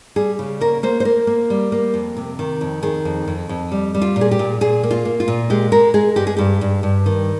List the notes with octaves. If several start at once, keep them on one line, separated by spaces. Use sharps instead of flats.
G3 G#4
C#3
A#3 A#4
A#3 C5
C5
A#3 A#4
A#3
G3
A#3
F2
C3
D#3
F2
D#3 G#4
F2
F2
F2
G3
G3
F4
A#2
G#4
G4
A#2
A#2 G#4
A#3
F4
A#3
F4
A#2
G#3 G4
G#3 A#4
G#3 G#4
G2 G4
G#4
G2 G4
G2
G2
D#3